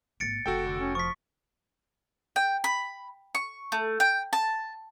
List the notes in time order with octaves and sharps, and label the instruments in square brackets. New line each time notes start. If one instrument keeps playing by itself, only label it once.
[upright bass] G#1 A#3 [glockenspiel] A6 C#7 D7
[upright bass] F1 [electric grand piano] F#4 A4 G5
[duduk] D3
C#4
[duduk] F3 [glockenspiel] C#6 B6
[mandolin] G5
B5
C#6
A3
G5
A5